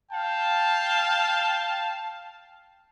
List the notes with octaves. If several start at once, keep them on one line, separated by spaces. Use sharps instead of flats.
F5 G5 A5